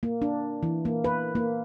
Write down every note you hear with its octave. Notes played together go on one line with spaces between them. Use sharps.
A#3
D4
E3
A#3
B4
A#3